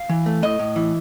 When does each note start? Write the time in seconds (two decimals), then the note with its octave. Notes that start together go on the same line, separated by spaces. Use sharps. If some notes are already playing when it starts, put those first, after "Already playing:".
Already playing: F5
0.09 E3
0.26 A3
0.43 A2 D#5
0.59 A2
0.76 E3